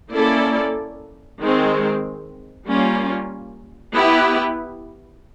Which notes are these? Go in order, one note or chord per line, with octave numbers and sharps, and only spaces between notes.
A#3 C#4 E4 A4 D5
D#3 G#3 C4
G3 A#3 C#4 F4
B3 E4 G4 B4